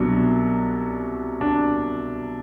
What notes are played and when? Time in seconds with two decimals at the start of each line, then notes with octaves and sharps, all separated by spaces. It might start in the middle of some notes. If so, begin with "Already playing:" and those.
Already playing: C2 B2 F#3 D4
1.41 D4